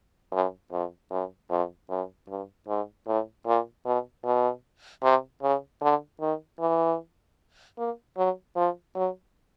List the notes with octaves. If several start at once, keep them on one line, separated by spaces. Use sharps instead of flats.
F#2
F2
F#2
F2
F#2
G2
G#2
A2
A#2
B2
B2
C3
C#3
D3
D#3
E3
A#3
F#3
F3
F#3